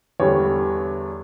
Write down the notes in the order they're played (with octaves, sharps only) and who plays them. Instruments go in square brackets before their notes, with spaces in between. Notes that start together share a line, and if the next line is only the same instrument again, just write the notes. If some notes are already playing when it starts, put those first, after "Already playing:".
[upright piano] E2 D3 G3 C#5